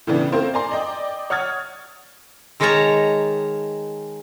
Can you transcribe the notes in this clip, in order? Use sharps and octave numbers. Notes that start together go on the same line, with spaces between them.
A2 C#3 E3 B3 D4
A3 A#3 C4 F4 A#4 C5
D5 G#5 A#5 C6
D5 D#5 G5
C#5 F#5 D#6 F6 G#6 A6
D#3 G#3 A#4 C#5 A5 A#5